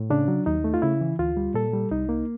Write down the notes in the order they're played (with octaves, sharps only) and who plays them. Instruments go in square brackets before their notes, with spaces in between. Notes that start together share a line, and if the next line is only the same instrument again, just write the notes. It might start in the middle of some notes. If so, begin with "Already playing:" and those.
Already playing: [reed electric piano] A2
C#3 D4
F#3
D#2 D#4
A3
F4
C#3 E4
E3
D2 F4
G3
A#2 A4
G3
C2 D#4
A#3